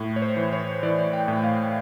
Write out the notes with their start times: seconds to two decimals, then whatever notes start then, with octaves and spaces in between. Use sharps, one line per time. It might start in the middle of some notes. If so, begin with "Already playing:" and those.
Already playing: A2
0.16 C#5
0.22 C5
0.37 E3
0.53 C#5
0.83 E3 D5
1.13 G5
1.28 A2
1.44 F5